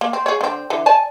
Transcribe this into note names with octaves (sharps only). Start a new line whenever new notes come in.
A#3
C4
G#4 C#5
D3 C4
D3 E3
D5 G#5 A5